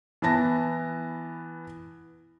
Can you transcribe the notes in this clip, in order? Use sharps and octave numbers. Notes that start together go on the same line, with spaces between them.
E3 B3 A5 A#6